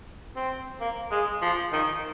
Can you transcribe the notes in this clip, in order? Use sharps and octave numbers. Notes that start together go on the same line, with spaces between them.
C4
A#3
G#3
F3
D#3